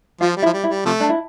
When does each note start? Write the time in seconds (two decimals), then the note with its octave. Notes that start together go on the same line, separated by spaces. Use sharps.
0.21 F3 F4
0.37 G3
0.43 E4
0.45 F3
0.53 G3
0.64 E4
0.69 G3
0.85 C3 F3 A3
1.00 D4
1.09 E4